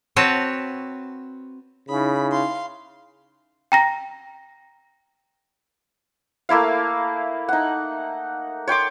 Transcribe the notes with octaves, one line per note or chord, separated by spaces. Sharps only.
C4 F#4 B4 C#5 A5
C#3 D#4 E4 E5 B5
F5 C6
G5 A#5 A#6
A3 A#3 E4 F5
D#4 F#5
C#5 G5 C6 D6